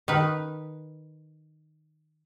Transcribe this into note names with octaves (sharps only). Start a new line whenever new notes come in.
D#3 B4